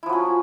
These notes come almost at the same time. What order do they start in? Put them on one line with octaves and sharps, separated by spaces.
E4 F3 F#3 C#4